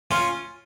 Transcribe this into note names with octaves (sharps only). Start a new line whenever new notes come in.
C#4 F4